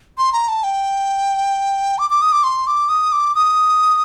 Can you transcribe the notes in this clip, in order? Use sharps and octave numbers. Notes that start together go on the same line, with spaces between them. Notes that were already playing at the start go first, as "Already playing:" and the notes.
C6
A#5
A5
G5
D6
D6
D#6
D6
C6
D6
D#6
D6
D#6